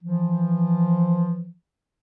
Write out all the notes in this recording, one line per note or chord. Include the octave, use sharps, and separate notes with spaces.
E3 F3